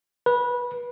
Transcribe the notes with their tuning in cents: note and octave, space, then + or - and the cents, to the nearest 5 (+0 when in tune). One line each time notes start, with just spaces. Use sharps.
B4 -20